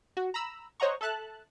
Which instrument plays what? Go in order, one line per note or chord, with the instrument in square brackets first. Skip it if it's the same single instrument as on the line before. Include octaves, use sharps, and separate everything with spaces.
[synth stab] F#4
A#5 B5 E6
C5 C#5 D#5 F#5 A#5 C#6
A4 E5 A5 F#6